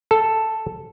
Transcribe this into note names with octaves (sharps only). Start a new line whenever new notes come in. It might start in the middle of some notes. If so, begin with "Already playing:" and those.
A4